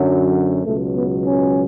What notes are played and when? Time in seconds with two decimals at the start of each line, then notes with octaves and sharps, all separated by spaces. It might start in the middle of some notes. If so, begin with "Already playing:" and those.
Already playing: F#2 D3 F#3
0.65 C#2 B2 F#3 A3
0.95 B3
1.24 C#4